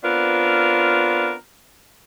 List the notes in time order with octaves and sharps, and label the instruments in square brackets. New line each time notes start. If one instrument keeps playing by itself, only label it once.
[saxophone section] B3 C4 D4 F4 A#4